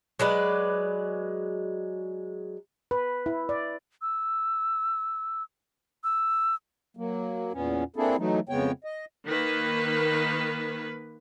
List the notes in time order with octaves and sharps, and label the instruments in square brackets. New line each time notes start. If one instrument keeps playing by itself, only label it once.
[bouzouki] F#3 G#3 B4 D5
[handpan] B4
E4
D5
[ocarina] E6
E6
[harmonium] F#3 A#3
E2 A#2 B3 C#4
A#3 C4 D4 E4 G#4 A4
E3 F#3 A3 D#4
F2 C#3 G#3 B3 C#5 G5
D#5
[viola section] D#3 A#3 B4